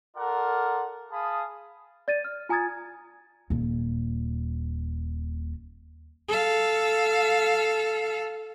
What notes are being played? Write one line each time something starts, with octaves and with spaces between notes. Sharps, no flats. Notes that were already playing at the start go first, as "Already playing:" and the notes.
F4 A4 A#4 D5 F#5
G#4 F5 A5 B5 D#6
D5 A6 D#7
F6
F4 G#5 A#5 D#6 G#6 A6
D#1 A#2
A4 F5